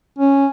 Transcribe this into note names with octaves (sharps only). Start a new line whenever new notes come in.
C#4